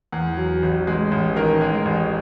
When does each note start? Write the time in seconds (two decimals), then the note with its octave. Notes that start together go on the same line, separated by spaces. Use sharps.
0.12 E2
0.37 F#3
0.63 A1
0.87 G#3
1.11 A1
1.36 D#3 A#4
1.61 G#3
1.85 A1